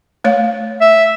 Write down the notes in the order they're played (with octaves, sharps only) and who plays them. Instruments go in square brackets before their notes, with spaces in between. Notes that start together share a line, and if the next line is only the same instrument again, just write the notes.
[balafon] A3 C#5 F5
[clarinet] E5